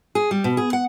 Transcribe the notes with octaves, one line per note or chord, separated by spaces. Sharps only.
G#4
G3
B2
G#4
F#5